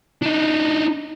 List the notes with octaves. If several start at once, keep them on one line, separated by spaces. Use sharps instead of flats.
D4 D#4